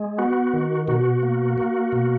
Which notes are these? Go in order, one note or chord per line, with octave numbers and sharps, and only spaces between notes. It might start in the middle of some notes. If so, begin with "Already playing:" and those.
Already playing: G#3
B3 F#4
D#3
B2 F#4
A#3
A#3
B2